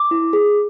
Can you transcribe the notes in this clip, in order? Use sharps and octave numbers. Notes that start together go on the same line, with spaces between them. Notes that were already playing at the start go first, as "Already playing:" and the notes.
Already playing: D6
E4
G#4